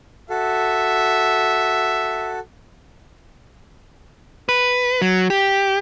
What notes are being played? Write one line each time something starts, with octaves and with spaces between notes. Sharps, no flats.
F#4 A4 E5
B4
F#3
G4